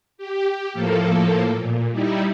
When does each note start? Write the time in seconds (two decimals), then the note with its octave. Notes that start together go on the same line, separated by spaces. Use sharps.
0.18 G4
0.73 A2 F3 A#3 A4
1.56 A#2
1.91 G3 D#4 E4